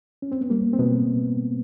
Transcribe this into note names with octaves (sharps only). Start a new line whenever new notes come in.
C#4
C4
B3
G3 A#3
C4
B2 B3